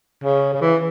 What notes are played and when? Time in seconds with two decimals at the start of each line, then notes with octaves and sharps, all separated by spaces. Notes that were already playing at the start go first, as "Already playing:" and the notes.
0.24 C#3
0.54 C#3
0.62 E3